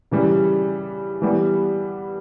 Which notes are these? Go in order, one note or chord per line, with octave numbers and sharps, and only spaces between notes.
C#3 E3 G3
E3 G3 B3